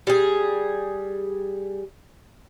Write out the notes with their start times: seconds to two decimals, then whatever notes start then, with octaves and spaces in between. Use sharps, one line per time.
0.07 G3 G#4